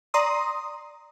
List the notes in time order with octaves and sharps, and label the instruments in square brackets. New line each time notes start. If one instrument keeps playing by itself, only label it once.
[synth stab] D5 A#5 C6 D#6